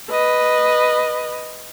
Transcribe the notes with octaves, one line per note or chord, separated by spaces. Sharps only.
B4 D#5